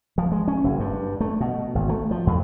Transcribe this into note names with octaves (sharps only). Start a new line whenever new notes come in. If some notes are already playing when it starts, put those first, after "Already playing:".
F3
G#3
C#4
F#1
G2
A3
B2
G#1
A3
F3
F2